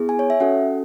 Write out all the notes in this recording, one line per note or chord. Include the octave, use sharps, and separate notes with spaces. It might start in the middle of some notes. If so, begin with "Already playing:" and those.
Already playing: B3 E4 G#4
G#5
C#5
E5
C#4 F#4 A4 F#5